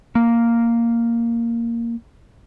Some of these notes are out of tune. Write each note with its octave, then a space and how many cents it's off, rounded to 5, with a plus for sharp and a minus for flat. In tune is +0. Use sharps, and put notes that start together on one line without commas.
A#3 -5